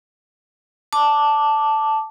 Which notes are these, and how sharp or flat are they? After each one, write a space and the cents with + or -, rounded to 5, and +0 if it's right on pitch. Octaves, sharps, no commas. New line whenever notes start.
A5 +0 D6 +0